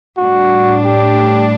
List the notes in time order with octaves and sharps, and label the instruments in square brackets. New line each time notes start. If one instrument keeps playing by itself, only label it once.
[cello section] A2 G3 D4 [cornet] F#4
[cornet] G4